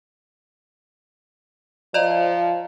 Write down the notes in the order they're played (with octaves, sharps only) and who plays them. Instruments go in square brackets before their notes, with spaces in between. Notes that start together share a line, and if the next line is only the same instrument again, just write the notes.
[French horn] F3 [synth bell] D5 D#5 A#5